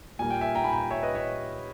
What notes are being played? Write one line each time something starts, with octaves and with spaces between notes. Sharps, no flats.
A#2 G3 A#3 G#5
G5
E5 G#5
G5 A#5
G#5 B5
G5 A#5
C#5 E5
B4 D#5
C#5 E5